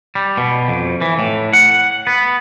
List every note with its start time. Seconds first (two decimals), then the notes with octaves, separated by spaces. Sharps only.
0.15 G3
0.37 B2
0.68 F2
1.01 E3
1.19 A2
1.53 F#5
2.07 B3